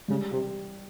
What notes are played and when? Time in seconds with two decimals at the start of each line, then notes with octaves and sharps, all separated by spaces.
0.08 C#3 G3
0.32 C3 G4